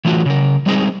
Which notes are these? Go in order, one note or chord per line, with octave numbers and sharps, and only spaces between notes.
E3 A3 F4 F#4
C#3 A#4
G3 G#3 C4 D#4 G#4 D#5